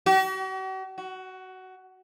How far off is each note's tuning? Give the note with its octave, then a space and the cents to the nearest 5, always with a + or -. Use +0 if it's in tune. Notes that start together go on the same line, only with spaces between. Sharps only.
F#4 +45
F#4 +15